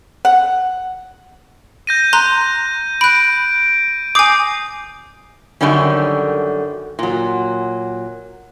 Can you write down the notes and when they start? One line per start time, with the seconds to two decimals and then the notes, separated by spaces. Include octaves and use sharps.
0.25 F#5
1.87 G6 A#6 D#7
2.13 A#5 C6 F#6
3.01 B5 F#6 D7
4.15 G#5 D6 D#6 G6 C7
5.61 F#2 B2 D3 D#3 G3 C#4
6.99 A#2 F#3